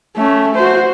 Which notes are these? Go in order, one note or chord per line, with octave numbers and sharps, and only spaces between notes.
A3 C#4
F#4 C5